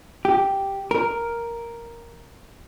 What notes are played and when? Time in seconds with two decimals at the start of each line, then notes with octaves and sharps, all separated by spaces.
0.25 G4
0.91 A#4